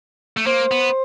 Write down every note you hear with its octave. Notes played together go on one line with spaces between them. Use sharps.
A3
A#3 C5
B3